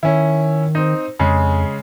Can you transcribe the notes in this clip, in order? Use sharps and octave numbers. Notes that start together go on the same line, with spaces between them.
D#3 C#4 E4
C4 D#4
F2 C#3 G#3